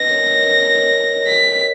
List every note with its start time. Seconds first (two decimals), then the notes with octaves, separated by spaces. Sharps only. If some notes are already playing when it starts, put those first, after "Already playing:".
Already playing: B4 D#5 A#6
0.09 A#4 C#5
0.19 D#5
0.26 A#4 C#5
0.43 A#4 C#5
0.60 A#4 C#5
1.27 B6